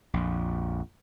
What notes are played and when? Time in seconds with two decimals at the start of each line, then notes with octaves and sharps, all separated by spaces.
0.14 A#1 F2